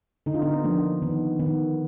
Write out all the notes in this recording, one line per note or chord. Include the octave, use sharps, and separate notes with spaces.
D3 D#4
F4
B3 D#4
F3 A#3 D4
D#3 B3
D#3 B3